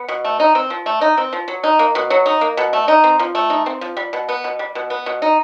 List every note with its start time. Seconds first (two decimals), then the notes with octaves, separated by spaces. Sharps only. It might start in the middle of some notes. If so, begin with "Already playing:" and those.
Already playing: B3
0.08 B2
0.25 A3
0.40 D#4
0.55 C4
0.70 F3
0.86 A3
1.01 D#4
1.17 C4
1.33 F3
1.48 F#3
1.64 D#4
1.79 A#3
1.95 B2
2.10 F#3
2.26 D#4
2.41 A#3
2.57 B2
2.73 A3
2.88 D#4
3.04 C4
3.19 F3
3.35 A3
3.50 D#4
3.66 C4
3.81 F3
3.97 G3
4.13 B2
4.29 B3
4.44 B2
4.59 G3
4.75 B2
4.90 B3
5.06 B2
5.22 D#4